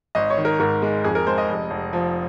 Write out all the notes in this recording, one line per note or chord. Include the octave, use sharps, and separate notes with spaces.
G#1 D#5
C#5
D#3
A#4
G#2 A#4
G#3
F2 G#4
A#4
G#3 C5
D#5
F1
F1
F3